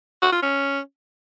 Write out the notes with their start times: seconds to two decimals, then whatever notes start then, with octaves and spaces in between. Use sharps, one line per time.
0.22 F#4
0.32 F4
0.42 C#4